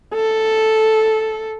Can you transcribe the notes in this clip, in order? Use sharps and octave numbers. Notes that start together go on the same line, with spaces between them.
A4